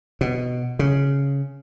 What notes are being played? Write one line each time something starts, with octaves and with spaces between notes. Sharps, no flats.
B2
C#3